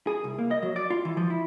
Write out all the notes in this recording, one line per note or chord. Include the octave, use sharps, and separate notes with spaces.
G#4
C2
A#3
D#5
F#3
D5
F4
E3
F3
E4